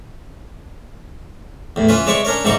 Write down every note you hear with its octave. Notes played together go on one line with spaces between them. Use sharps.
E2 A2
E3 C#4 F4 B4
C3 G#3 C#5 D5 E5 C#6
C#4 D4 A#4 C#5
G#2 C3 E3 G3 A#5 C#6